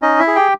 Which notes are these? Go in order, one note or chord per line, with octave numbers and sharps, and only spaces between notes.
C#4 D#4 D#5
E4 E5
G#4
G4 G5